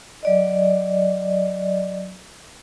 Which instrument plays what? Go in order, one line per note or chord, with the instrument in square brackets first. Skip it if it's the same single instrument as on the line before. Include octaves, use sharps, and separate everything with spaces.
[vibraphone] F#3 D5 D#5